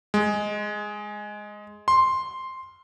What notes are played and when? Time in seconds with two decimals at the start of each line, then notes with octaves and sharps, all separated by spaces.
0.14 G#3
1.88 C6